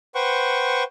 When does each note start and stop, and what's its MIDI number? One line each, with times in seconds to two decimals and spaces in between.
0.15 0.84 71
0.15 0.84 72
0.15 0.84 78
0.15 0.84 79
0.15 0.84 85